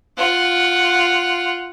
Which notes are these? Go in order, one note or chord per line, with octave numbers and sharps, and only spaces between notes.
F4 F#5